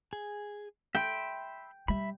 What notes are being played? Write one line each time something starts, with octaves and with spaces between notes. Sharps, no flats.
G#4
E5 G5 B5 C6
G3 E5 B5